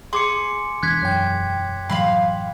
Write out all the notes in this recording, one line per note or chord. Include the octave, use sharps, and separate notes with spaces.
G#4 C6 D6 C#7
E1 E3 D4 F#6 G#6 B6
F#2 G5
A2 E3 F#3 F5 B5 C6